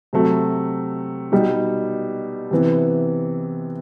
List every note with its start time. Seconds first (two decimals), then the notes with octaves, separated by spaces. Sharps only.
0.13 C3 F#3 A3
1.32 B2 G3 D#4
2.51 C3 E3 B3